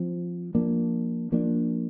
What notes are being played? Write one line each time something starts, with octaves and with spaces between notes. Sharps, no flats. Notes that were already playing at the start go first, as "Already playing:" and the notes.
Already playing: F3 C4
F3 A#3 D4
F3 A#3 D4